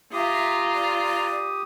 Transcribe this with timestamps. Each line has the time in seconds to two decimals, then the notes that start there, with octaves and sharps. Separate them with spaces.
0.13 F4 G4 E5 A#5 D#6
0.75 D5